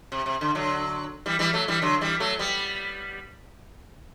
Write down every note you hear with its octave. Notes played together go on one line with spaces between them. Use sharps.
C3
C3
D3
D3 F#3
E3 G3
E3 G3
F#3 A3
E3 G3
D3 F#3
E3 G3
F#3 A3
G3 B3